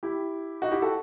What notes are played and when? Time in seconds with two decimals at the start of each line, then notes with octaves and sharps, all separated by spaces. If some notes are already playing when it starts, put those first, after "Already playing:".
0.03 E4 G4
0.62 D#4 F#4
0.72 E4 G4
0.82 F#4 A4